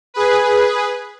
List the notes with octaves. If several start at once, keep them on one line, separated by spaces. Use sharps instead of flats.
G#4 B4